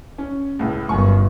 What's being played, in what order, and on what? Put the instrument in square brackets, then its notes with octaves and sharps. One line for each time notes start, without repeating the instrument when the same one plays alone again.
[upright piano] C#4
C#2 A2
[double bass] G1 [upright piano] F#2 G#5 C#6